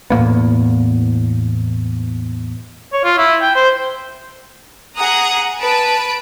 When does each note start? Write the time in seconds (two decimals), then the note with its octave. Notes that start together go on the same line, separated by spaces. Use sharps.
0.10 E2 A2 A#3 B3
2.93 C#5
3.04 F4
3.18 E4
3.42 G5
3.55 C5
4.96 G#4 F#5 A#5 D#6
5.61 B4 A5 D7